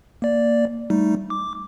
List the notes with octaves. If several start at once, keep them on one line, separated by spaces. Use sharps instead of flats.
A#3 D5
G3 A3 D#4
D6